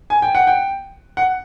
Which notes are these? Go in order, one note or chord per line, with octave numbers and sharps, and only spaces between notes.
G#5
G5
F#5
G5
F#5